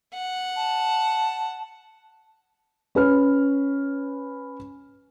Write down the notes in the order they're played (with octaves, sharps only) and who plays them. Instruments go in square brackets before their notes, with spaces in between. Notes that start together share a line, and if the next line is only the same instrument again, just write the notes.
[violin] F#5
[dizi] A5
[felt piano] C#4 B4 F6